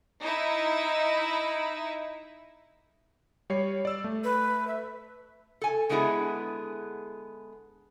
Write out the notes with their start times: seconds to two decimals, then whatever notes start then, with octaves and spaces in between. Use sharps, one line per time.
0.21 D#4 E4 E5
3.50 G3 C#5 C7
3.85 D5 E6
4.04 A3
4.24 B4
4.67 E5
5.61 A4 G#5
5.89 D3 G#3 B3 E4 G#4 B4